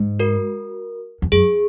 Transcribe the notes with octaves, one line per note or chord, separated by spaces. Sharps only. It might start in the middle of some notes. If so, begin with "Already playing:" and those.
Already playing: G#2
F#4 A#4
E2
F#2 G#4